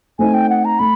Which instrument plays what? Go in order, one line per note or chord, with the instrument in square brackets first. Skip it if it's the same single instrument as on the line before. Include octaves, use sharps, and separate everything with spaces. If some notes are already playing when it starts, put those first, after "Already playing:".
[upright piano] A3 C4 D#4 [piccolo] G#5
[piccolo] G5
F#5
A#5
[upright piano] A3 [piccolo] B5